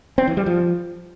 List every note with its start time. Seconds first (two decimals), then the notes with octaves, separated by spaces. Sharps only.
0.18 C4
0.27 E3
0.37 G3
0.46 F3